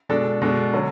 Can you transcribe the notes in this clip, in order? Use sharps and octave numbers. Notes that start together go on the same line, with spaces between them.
B2 G#3 D4 A4
B2 G#3 D4 A4
D3 F#3 C#4